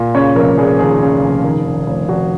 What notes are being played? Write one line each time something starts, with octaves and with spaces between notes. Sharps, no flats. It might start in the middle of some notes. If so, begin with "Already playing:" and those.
Already playing: A#2
C#3 C#5
F1 A#4
F1 G#4
D#2 G#4
C#3
F1
D#3
D#3
F1
F1 F#4